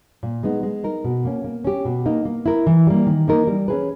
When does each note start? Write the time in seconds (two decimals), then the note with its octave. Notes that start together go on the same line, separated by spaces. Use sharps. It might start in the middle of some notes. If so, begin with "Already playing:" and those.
0.23 A#2
0.43 G#3 B3 D#4
0.63 G#3
0.84 D#4 A#4
1.04 B2
1.25 A#3 C#4
1.44 A#3
1.64 C#4 G4
1.85 B2
2.06 A#3 D#4
2.25 A#3
2.46 E4 A#4
2.67 E3
2.87 G3 A#3
3.07 D#3
3.28 A#3 D#4 A#4
3.47 G3
3.68 C#4 E4 G#4 B4